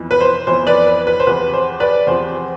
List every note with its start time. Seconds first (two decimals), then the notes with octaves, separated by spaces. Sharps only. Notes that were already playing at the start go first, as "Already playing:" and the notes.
Already playing: F2 E3 B3
0.11 B4
0.21 C5
0.47 F2 E3 B3 C5
0.67 B4 D5
0.87 B4
1.07 B4
1.20 C5
1.27 E2 C3 F3 B4
1.54 C5
1.80 B4 D5
2.07 E2 C3 F3 C5